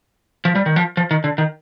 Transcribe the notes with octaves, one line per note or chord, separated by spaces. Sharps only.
F3
G3
D#3
F3
F3
D#3
D3
D#3